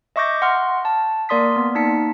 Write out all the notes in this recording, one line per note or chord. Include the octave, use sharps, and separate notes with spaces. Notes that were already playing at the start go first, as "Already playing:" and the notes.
D#5 E5 C#6 D6 G6 A#6
F#5 C6 F6
A5
A#3 A#4 D5 C6 D#6 B6
B3
A#3 D#4 A5 B6 C#7